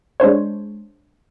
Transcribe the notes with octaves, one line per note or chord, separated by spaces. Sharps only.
G#3 D4 C5 C#5